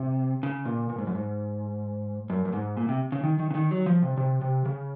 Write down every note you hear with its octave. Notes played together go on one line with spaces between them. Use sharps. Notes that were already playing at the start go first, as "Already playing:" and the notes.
Already playing: C3
C#3
A#2
A#2
G#2
F#2
G#2
F#2
F#2
G#2
A#2
C3
C#3
D#3
D#3
C#3
D#3
F#3
F3
C3
C3
C3
C#3